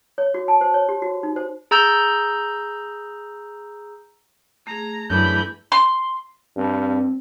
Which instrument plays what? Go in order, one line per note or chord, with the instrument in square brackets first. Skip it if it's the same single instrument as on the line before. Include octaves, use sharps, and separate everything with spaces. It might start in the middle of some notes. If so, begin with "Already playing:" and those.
[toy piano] C#5
F#4
A5
C5
C#5
G4
F#4
D#4
C5
[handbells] G#4 A#5 E6 G6
[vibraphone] A3 G#4 [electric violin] A#5
[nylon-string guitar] F#2 [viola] D3 E3 [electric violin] B5 G6
[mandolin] C6
[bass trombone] G2 [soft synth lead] C4